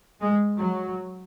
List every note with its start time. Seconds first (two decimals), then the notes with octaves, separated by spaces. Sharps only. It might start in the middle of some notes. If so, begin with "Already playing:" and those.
0.21 G#3
0.59 F#3